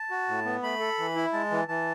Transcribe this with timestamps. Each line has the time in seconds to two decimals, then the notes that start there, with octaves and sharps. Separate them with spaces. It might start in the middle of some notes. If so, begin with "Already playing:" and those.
Already playing: A5
0.11 F#4
0.28 A2
0.45 B3
0.63 A3 B5
0.80 A4
0.98 E3
1.16 E4
1.33 G#3 A5
1.51 E3
1.68 E3 A5